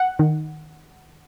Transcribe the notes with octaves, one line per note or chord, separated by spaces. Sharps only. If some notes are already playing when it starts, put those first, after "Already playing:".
Already playing: F#5
D#3